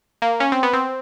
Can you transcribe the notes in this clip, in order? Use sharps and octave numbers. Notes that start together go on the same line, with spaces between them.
A#3
C#4
C4
B3
C4